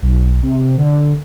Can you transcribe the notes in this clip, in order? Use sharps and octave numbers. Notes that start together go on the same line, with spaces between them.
B1
C3
D3